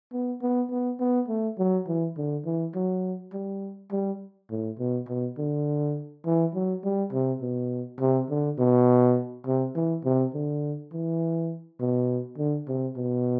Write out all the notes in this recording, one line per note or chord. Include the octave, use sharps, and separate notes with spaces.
B3
B3
B3
B3
A3
F#3
E3
D3
E3
F#3
G3
G3
A2
B2
B2
D3
E3
F#3
G3
C3
B2
C3
D3
B2
C3
E3
C3
D3
E3
B2
D3
C3
B2